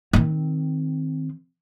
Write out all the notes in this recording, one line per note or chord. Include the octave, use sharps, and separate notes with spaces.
D#3 C4